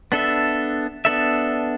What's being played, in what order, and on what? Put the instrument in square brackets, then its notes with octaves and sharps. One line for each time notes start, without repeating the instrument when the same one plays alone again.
[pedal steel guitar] B3 D4 A4 E5
B3 D4 A4 E5